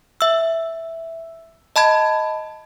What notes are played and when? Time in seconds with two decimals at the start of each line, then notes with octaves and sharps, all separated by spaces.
0.21 E5 E6
1.76 D#5 A5 B5 G#6